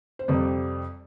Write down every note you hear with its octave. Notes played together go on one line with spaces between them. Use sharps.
C5
F2 C3 G3 C4 D5